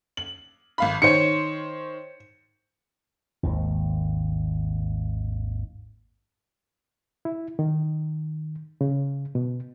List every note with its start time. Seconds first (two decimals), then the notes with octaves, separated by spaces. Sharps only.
0.17 F#7
0.78 G#1 F5 B5
1.02 D#3 C5 C#5 C#7
3.43 G#1 D#2
7.25 E4
7.59 D#3
8.81 C#3
9.35 B2